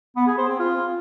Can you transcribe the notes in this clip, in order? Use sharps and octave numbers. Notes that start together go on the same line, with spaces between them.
B3
G#4
C5
C4
F4